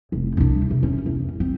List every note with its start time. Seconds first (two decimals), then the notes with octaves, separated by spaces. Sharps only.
0.12 F1
0.37 C2 D4
0.70 C3
0.83 C#4
1.06 E2
1.40 C4